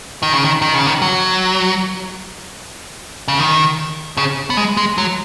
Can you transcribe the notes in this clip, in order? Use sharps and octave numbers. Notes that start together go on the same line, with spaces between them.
D#3
C#3
D#3
D#3
C#3
D#3
F#3
C#3
D#3
C#3
B3
G#3
G#3
F#3